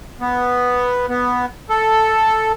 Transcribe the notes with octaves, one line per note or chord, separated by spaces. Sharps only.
B3
B3
A4